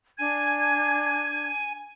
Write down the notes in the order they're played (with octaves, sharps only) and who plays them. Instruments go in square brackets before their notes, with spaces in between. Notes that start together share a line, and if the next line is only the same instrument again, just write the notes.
[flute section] D4 G#6 [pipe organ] G#5